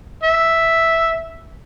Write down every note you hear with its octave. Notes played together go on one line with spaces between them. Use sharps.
E5